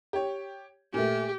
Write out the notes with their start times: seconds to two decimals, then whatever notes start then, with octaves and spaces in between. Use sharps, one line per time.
0.13 G4 C#5
0.94 A#2 A3 G4